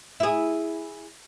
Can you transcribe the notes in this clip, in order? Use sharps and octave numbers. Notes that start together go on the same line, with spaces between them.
E4 G#4